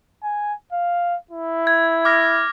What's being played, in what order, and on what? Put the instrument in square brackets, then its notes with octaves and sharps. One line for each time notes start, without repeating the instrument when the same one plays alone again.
[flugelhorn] G#5
F5
E4
[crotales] G#6
D6 F6 A#6